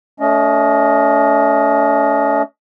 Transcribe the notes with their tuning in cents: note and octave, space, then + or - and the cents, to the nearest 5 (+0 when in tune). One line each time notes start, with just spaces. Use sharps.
A3 +0 C#4 +45 D#5 +0